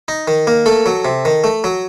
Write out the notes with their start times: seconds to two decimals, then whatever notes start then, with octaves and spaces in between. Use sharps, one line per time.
0.08 D#4
0.28 D#3
0.47 A#3
0.66 A3 A4
0.86 F#3
1.05 C3
1.25 D#3
1.44 A3
1.64 F#3